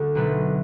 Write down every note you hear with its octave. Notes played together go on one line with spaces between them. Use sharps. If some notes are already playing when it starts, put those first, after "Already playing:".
Already playing: D2 D3
B1 B2 A3 B4